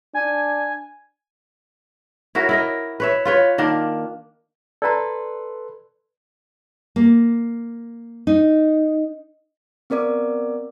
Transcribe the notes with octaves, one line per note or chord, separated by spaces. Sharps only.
D4 G#5
E4 F#4 A#4 C#5
E4 A#4 D#5
B4 C#5 E5
F4 B4 C#5
D#3 A#3 D4
A4 B4 D5 A#5 C6
A#3
D#4
B3 C4 A#4 D5 D6